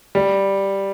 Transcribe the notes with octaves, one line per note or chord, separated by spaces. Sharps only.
G3